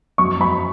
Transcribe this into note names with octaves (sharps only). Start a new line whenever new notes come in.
F#2 C#6
F#2 B5